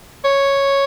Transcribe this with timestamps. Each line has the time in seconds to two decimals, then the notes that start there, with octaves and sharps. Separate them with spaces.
0.25 C#5